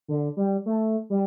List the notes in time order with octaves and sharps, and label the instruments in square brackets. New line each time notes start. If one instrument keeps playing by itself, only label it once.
[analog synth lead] D3
G3
A3
G3